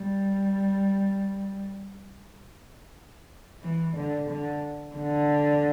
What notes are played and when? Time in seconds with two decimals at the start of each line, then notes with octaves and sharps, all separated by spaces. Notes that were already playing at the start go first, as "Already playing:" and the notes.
Already playing: G3
3.64 E3
3.97 D3
4.31 D3
4.97 D3